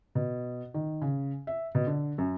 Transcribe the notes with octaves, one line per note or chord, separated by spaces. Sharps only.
B2
D#3
C#3
E5
B2
D3
F#2